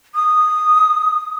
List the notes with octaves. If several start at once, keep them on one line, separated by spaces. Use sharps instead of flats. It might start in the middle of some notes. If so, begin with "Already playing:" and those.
D#6